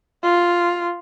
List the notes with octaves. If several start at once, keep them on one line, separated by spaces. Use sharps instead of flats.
F4